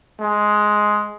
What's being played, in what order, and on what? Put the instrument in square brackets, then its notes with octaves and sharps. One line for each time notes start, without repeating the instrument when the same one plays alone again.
[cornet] G#3